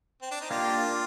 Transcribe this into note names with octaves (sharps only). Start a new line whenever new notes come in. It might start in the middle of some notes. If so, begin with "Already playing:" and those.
C4
D4
D#4
A#3 D4 F4 G4